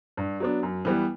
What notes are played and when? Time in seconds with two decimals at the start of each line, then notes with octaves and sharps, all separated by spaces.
0.17 G2
0.40 F#3 B3 D4
0.63 F#2
0.85 E3 G3 B3